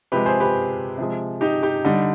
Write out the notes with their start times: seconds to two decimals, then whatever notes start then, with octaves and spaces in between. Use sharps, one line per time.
0.12 C3 F3 G#3 G4 B4
0.26 G#4 C5
0.40 G4 B4
0.98 C3 F3 G#3
1.41 D#4 G4
1.63 D#4 G4
1.84 D3 G3 D#4